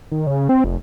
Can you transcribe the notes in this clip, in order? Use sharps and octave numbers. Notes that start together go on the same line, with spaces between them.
D#3
C#3
C4
F1